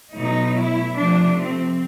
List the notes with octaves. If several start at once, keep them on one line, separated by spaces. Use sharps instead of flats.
B2 F#3 A3 D#4
E4
C3 F3 A3 D4
C4